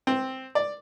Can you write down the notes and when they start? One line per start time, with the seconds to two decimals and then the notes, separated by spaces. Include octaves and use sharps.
0.07 C4
0.55 D5